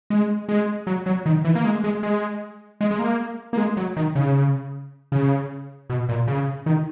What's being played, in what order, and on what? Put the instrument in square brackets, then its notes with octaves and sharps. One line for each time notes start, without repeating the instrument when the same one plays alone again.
[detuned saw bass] G#3
G#3
F#3
F#3
D#3
E3
A#3
G#3
G#3
G#3
G#3
G#3
A#3
A#3
G#3
F#3
D#3
C#3
C#3
B2
A#2
C#3
D#3